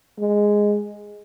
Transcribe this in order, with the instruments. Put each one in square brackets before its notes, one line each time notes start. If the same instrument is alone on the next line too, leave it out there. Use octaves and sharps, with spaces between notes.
[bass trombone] G#3